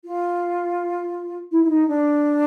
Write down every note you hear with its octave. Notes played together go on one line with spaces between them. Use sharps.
F4
E4
E4
D#4
D4